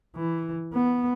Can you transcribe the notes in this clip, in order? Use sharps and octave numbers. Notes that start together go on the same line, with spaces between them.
E3
B3